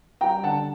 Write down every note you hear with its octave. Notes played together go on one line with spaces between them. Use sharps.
G3 G5 A#5
D3 F#5 A5